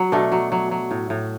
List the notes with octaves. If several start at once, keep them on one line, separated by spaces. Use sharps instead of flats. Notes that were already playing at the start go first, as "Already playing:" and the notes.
Already playing: F#3
B2 A3 D4
F#3
F#3
F#3
A2
A2